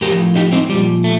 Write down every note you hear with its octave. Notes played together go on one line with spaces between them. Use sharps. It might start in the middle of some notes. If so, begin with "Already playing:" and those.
A2 F3 G4 A#4
D#4 G4
C4 D#4
A#2 F3 G3
A3